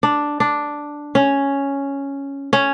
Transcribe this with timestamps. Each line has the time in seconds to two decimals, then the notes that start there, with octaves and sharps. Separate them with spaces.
0.03 D4
0.40 D4
1.15 C#4
2.53 C#4